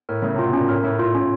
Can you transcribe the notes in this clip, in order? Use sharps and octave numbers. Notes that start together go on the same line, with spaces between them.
A2 A#4
C#3 A3
C3 F4
B2
A#2 C#4
A2 A#4
A2 A3
A2 F4
C#4
A2